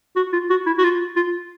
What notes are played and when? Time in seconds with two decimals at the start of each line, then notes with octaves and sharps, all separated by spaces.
0.16 F#4
0.33 F4
0.50 F#4
0.67 E4
0.79 F#4
0.84 F4
1.16 F4